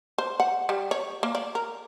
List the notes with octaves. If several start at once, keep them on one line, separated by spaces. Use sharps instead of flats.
C5
F#5
G3
C#5
A#3
D5
A#4